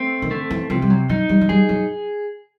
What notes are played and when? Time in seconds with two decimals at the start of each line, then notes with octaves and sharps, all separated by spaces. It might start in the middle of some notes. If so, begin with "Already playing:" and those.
Already playing: A3 C4
0.22 D#3
0.31 D3 A3
0.50 E3
0.70 C3 F3
0.82 G3
0.90 F#3
1.09 F#3 D#4
1.29 G3
1.41 F#3
1.49 G3 G#4
1.69 F#3